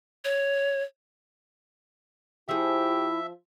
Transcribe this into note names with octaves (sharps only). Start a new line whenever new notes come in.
C#5
F3 E4 G4 G#4 E5